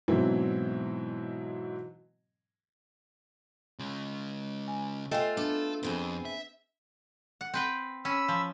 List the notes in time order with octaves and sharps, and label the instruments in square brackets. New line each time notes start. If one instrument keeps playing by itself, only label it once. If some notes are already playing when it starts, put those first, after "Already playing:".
[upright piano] G#2 B2 E3 F#3 C4 E4
[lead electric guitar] C#3 G#3
[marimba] G#5
[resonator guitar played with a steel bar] A3 F4 [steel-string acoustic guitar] A4 C5 [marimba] D#5 G5 G#5
[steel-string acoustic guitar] B3 [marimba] D4 [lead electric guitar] A4
[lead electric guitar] F2 [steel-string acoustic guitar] B3 C4 G#4
[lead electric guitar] E5
[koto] F#5
C4 B4 G5
[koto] C#4 [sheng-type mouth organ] B5 E6
[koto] F3